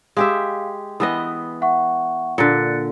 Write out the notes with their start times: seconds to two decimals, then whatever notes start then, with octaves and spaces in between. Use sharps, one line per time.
0.17 G#3 G4 E5 F5
1.00 E3 B3 D#5 D#6
1.61 E5 F#5 C#6
2.38 A#2 D3 F#6 A6 C#7